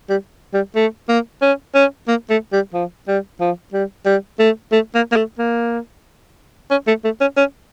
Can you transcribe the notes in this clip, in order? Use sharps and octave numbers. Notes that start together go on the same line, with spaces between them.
G3
G3
A3
A#3
C#4
C#4
A#3
A3
G3
F3
G3
F3
G3
G3
A3
A3
A#3
A#3
A3
A#3
C#4
A3
A3
C#4
C#4